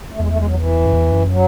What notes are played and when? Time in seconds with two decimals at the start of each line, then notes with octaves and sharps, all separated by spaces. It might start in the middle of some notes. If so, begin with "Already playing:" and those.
0.12 A3
0.20 E2 G#3
0.29 A3
0.38 G#3
0.47 F#3
0.57 E3
0.85 F#2
0.93 E2
1.12 F#2
1.30 F#3